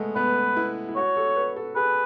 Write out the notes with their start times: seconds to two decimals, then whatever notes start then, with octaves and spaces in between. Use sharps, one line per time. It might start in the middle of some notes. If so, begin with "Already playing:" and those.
Already playing: G#3 A3 B3
0.16 B3 B4
0.56 E4
0.89 E4
0.96 F#4 C#5
1.16 A4
1.36 B4
1.56 A4
1.76 G#4 B4